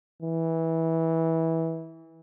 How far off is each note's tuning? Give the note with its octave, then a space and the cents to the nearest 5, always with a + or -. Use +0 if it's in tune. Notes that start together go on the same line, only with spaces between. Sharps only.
E3 -20